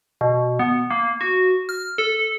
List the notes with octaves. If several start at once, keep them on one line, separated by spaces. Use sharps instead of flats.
B2
B3
A#3
F#4
F6
A4